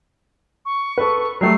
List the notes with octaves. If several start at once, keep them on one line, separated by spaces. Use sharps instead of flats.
C#6
A4 B4
F#3 G3 A3 C7